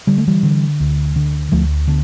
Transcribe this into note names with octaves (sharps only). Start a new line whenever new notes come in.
D3 G3
A3
E3 G3
D3
D2
D3
D2 F3 A3
D3 B3 D4